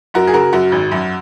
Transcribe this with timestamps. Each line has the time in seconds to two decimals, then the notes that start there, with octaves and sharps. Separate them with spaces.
0.14 F#2 F#4 A#4
0.27 G#4
0.33 C#3 F#4 A#4
0.53 F#2 F#4
0.72 G#1
0.91 F#2